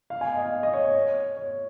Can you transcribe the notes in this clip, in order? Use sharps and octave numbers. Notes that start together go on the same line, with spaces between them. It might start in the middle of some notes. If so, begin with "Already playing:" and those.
F5
G#5
D#5
F5
D#5
C#5
C#5
C#5